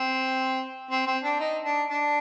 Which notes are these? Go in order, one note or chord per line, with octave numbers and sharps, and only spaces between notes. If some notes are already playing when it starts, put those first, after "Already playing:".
Already playing: C4
C4
C4
D4
D#4
D4
D4